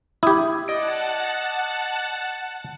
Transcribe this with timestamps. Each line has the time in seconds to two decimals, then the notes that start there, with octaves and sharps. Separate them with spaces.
0.23 E4 G4 D#6 G#6
0.68 D5 D#5 F#5 A5 D7